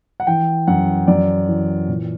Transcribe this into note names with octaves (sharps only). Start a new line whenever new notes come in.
F#5
E3 G5
F#2 F#5
F#2 D5
E3
A#2